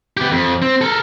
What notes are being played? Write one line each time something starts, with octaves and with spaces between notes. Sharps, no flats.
B3 G4
F2
C4
A4 A#4